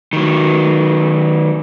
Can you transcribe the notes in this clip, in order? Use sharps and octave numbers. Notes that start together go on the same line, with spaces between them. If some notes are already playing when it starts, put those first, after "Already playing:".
D#3 F#3